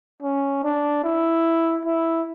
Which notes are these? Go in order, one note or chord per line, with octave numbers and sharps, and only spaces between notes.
C#4
D4
E4
E4